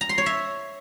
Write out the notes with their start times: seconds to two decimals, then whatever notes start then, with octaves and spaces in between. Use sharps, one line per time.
0.01 A#5
0.09 C6
0.18 C#5
0.26 E5